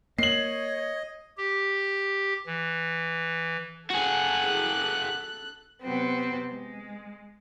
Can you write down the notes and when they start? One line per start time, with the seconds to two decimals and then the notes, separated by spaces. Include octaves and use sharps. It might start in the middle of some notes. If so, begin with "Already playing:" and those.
0.19 A#3 C#5 D#5 C7 F#7
1.37 G4
2.47 E3
3.90 F#4 G#4 A4 F#6
5.82 C3 F#3 B3 C4
6.51 G#3